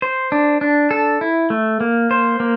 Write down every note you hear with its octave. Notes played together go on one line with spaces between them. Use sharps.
C5
D4
D4
A4
E4
A3
A#3
C5
A#3